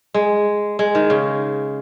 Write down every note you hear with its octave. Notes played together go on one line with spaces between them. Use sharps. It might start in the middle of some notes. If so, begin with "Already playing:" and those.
G#3
G#3
D#3
C#3